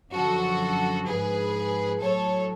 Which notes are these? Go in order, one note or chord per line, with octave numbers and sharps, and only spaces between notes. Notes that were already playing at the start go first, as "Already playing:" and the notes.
F#2 D3 F3 F#4 A4
G#2 F3 G#4 B4
A2 F#3 A4 C#5